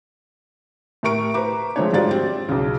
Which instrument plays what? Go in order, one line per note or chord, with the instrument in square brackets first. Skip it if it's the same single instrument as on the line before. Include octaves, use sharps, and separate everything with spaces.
[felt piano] A2 G4 A#4 C#6 D7
B4 C5 A#5 D6
F3 G#3 A3 C4 D4 C#5
G#2 F#3 G3 F4 D5 A6
C4
B1 C#3